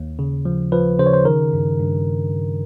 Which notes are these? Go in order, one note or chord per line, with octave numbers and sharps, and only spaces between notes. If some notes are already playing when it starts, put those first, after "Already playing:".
Already playing: D#2
C#3
F3
F3 B4
C#3 C5
C#5
C5
D#3 A#4
G2
G2